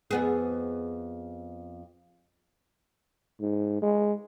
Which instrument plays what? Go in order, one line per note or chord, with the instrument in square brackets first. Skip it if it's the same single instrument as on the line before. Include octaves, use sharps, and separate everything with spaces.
[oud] F2 B3 G#4
[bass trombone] G#2
G#3